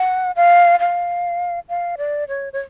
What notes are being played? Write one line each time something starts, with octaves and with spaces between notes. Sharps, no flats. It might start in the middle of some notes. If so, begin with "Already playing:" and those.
Already playing: F#5
F5
F5
F5
D5
C#5
C#5